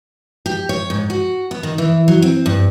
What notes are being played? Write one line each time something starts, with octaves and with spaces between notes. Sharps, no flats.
G4
C#5
G#2
F#4
B3
D#3
E3
F#3
C4
G2